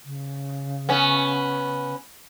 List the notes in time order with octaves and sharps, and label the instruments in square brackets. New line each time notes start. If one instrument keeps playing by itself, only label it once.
[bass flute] C#3
[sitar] B3 C#4